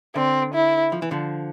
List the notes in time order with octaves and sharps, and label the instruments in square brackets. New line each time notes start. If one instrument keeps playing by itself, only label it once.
[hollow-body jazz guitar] D3 [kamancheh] C4
[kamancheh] E4
[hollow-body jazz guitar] F3
E3
D3 F3